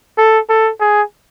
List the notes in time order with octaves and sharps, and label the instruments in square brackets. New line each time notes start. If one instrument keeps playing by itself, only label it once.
[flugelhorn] A4
A4
G#4